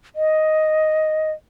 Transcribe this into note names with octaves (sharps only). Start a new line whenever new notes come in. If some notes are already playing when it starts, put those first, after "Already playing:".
D#5